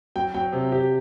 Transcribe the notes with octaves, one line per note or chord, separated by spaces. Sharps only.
F#3 G5
F#3 G5
C3
C3 G4